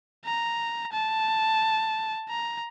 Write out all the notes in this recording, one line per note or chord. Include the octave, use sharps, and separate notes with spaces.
A#5
A5
A#5